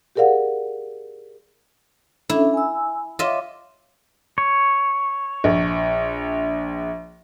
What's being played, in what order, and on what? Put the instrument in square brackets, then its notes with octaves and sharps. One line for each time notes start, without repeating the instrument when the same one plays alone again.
[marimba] G4 G#4 A#4 D5 F5 F#5
[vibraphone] C#4 D4 A4 [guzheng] E4
[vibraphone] G#5 E6
[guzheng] F4 D#5 E5 [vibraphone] C#5 D6
[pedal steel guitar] C#5
[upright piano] A#1